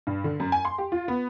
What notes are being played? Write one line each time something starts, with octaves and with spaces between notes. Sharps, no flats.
G2
D3
F#2
G#5
C6
G4
F4
B3